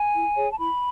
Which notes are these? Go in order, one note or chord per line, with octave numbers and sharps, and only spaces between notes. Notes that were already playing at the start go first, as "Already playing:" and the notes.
Already playing: G#5
E4
G#4 C#5
A5
E4 B5